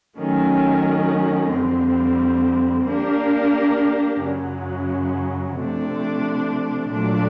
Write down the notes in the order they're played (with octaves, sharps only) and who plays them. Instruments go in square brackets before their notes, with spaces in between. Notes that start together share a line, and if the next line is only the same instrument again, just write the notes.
[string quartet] D#3 F#3 A3 C#4
F2 D3 G3 C4
A#3 D4 G4 A#4
F#2 C#3 F#3
C3 F3 A3 D4
A#2 F#3 A3 D4